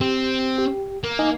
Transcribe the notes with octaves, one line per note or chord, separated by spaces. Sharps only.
C4 G4
G4
A#3
D#4 D#5 G#5